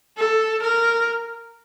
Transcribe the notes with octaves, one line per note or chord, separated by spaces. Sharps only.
A4
A#4